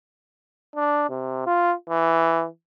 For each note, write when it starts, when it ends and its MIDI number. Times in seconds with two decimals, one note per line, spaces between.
0.76 1.07 62
1.09 1.45 48
1.47 1.73 65
1.90 2.45 52